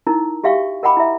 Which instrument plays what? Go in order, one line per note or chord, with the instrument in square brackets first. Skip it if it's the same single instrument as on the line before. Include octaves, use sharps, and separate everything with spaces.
[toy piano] D#4 E4 A#4
F#4 G4 E5 F5 G5 C#6
A#4 D#5 F#5 G5 B5 D6
E4 E5